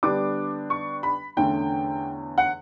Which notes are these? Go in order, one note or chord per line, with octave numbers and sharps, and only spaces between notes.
D3 G3 B3 D4 D6
C#6
B5
E2 D3 A3 C#4 G5
F#5